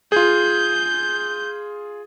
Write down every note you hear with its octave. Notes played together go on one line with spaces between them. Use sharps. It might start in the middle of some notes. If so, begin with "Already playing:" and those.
F4 G#4 G6